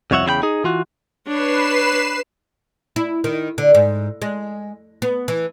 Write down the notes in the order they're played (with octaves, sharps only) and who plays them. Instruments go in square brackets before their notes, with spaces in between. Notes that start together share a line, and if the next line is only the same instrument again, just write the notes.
[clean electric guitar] C2 F2 F#4 C#5 E5 F#5
E2 C#3 E4 G5 B5
D#4 G#4
E3 F4 F#4
[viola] D4 C#5 [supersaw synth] B4 C7 E7
[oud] E4
D#3
D3
G#2
G#3
B3
E3